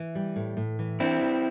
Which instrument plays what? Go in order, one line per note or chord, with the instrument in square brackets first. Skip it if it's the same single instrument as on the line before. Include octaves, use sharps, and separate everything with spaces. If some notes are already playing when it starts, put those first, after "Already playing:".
Already playing: [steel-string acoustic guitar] E3
G3
A2
A2
E3
[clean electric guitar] C4 E4 [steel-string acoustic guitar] D4
[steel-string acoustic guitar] E3